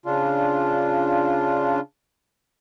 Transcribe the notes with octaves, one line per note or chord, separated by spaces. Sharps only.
C#3 D4 F4